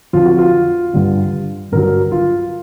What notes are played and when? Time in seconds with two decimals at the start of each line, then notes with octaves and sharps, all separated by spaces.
0.13 F2 D3 F#3 F4
0.26 F#4
0.39 F4
0.93 G2 D3 G3
1.72 G2 D3 F#3 A#4
2.12 F4